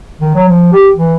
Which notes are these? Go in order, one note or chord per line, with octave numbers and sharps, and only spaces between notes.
D#3
F#3
F3
G4
E3